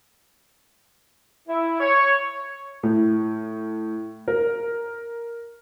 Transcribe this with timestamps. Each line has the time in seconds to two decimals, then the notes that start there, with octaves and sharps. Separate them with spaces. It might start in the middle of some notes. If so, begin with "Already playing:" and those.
1.48 E4
1.80 C#5
2.83 A2
4.28 A#4